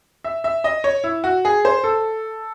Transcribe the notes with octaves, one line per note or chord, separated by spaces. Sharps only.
E5
E5
D#5
C#5
E4
F#4
G#4
C5
A4